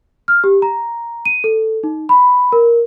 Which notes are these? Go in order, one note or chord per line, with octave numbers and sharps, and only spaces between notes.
F6
G4
A#5
D#7
A4
D#4
B5
A#4